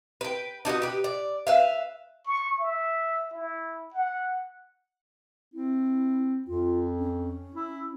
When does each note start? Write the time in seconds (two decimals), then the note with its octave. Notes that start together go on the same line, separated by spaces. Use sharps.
0.21 B4 G5
0.65 D4 D#4 F#4 B4
0.82 G4 B4
1.04 D5
1.47 B4 E5 F5
2.26 C#6
2.60 E5
3.34 E4
3.93 F#5
5.54 C4 E4
6.47 F2 F4
6.99 C#4
7.54 E4